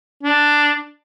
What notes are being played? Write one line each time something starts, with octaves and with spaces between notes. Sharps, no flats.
D4